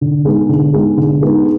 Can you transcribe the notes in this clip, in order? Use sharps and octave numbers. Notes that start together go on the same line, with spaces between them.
D3
G#3 B3 D#4
D3
G#3 B3 D#4
D3
G#3 B3 D#4